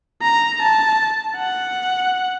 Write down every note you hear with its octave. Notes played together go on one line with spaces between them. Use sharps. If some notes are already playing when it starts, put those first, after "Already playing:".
A#5
A5
F#5